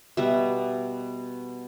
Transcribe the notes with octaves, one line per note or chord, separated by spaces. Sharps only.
B2 G3 B3 E5